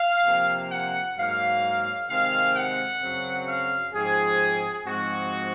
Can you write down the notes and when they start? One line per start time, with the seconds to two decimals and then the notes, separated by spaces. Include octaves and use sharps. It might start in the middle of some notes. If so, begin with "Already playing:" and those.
Already playing: F5
0.24 C3 F3 A#3
0.70 F#5
1.16 G#2 F#3 A#3 F5
2.09 C3 D#3 G#3 C4 F5
2.54 F#5
3.01 F#2 C#3 F#3 C4
3.46 F5
3.93 G#2 F3 C4 G#4
4.85 G#2 F3 G#3 C4 F#4